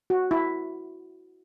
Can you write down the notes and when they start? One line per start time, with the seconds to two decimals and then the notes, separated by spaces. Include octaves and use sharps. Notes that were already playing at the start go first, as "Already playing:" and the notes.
0.10 F#4
0.31 E4